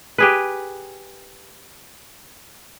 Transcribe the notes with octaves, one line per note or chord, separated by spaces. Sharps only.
G4 G#4 B4